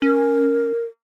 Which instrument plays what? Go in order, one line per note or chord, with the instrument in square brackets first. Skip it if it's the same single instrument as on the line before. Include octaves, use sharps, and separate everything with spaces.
[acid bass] C#4 [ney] A#4